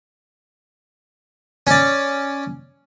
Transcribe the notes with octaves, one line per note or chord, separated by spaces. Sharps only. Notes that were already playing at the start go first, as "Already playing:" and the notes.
C#4 D5